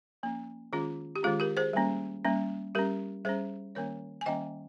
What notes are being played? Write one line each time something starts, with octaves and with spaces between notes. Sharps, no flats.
F3 A#3 C#4
D#3 G#3 C#4 F4 G#4
G4
D#3 G#3 C#4 F4 G#4
G4 A#4
G#4 C5
G3 A#3 C#4
G3 A#3 C#4
G3 C#4 G4 A#4
G3 C#4 G#4 C5
D#3 G3 A#3 C#4 A#4 C#5
G#5
D#3 G3 A#3 C#4 D#5 G5